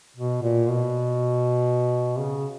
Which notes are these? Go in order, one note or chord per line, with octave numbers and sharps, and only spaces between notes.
B2
A#2
B2
C#3